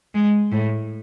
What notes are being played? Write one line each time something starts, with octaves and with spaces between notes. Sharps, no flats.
G#3
A2